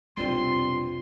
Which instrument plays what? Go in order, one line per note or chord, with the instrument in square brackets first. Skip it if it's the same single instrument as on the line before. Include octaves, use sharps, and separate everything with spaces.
[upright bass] F1 B1 [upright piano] G3 C4 D4 [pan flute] F4 [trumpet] C6